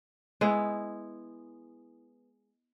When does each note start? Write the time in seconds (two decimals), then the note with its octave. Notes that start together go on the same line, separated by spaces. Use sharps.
0.41 G#3 B3 E4